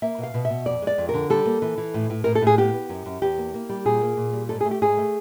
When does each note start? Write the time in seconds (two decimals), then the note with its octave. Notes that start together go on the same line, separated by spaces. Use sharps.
0.02 A#3 E5
0.18 B2
0.23 F5
0.34 B2
0.45 E5
0.50 B2
0.66 F2 D5
0.82 G#3 D5
0.98 F2
1.09 A#4
1.14 D3
1.30 G3 A4
1.46 A#3
1.62 E3
1.78 E3
1.94 A2
2.10 A2
2.24 A2 A#4
2.35 A4
2.42 A2
2.47 G#4
2.58 B3 G4
2.74 B3
2.89 F#2
3.06 F#2
3.22 E2 G4
3.38 A#3
3.54 A#3
3.69 G3
3.85 A#2 G#4
4.02 A#3
4.17 A#2
4.33 G3
4.49 G#2 A4
4.61 A3 G#4
4.71 G4
4.82 G#2 G#4
4.97 A3